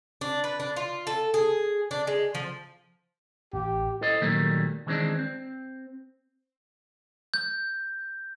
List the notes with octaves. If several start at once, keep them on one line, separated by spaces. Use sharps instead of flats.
D4
B4
D4
F4
A4
G#4
D4
G#3
F3
A1 G4
E4 A4 C5 D#5
A#2 D#3 F#3 G3 A3 A#3
D#3 E3 G#3 A3 C4 D4
C4
G6